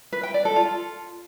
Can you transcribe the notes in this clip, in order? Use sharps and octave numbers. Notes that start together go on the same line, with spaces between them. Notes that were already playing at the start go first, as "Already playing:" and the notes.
B4
G5
D5
A4
F4